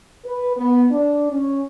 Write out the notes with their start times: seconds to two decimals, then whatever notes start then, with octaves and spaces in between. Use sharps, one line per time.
0.24 B4
0.57 B3
0.91 D4
1.31 C#4